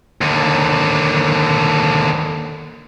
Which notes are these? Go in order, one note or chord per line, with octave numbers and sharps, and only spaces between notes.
D#2 D3